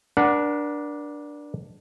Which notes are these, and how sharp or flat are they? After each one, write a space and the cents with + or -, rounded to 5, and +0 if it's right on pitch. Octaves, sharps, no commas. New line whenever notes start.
D4 +0 A#4 +45 F#5 +0